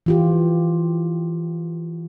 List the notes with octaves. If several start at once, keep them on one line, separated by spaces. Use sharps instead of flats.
E3 F4 G4